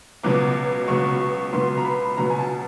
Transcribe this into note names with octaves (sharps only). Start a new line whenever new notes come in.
C#2 B2 F#3 B3 D6
C#2 B2 F#3 B3 C#6
C#2 B2 F#3 B3 C6
A#5
B5
C#2 B2 F#3 B3 A#5
G#5
A5